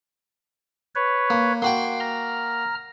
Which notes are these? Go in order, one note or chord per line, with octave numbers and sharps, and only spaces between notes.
B4 C#5
A#3
A#3 F#4 G5 C6
A#5 F6